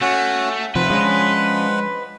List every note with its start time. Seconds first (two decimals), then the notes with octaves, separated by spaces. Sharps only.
0.01 A3 C#4 F#4
0.75 C3 F3 B4 C5 F#5
0.90 F3 G#3 C#4 D4